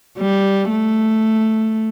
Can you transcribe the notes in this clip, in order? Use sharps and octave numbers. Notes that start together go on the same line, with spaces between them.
G3
A3